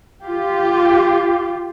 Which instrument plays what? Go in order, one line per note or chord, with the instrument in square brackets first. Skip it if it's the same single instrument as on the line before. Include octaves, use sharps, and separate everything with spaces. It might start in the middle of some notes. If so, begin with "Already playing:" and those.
[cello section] F4 G4